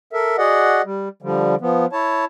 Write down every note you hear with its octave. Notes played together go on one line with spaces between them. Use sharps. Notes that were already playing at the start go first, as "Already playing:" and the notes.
A4 A#4 E5
F#4 G#4 D5 D#5 F#5
G3
D3 F3 G3
F3 B3
E4 C#5 A5